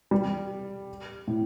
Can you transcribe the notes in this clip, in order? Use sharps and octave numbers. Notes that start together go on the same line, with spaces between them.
G3
A2